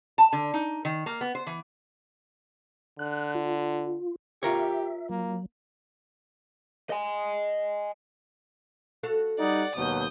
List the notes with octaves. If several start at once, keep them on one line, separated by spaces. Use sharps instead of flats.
A5
D3
D#4
D#3
A#3
B3
C5
E3
D3 F#6
F4
F4 G4 A#4 C#5 E5
F#3 A#3
D#5 G#5
F#4 A4 F5
G3 D#4 D5 F#5
D#2 B2 F#3 D#6 G6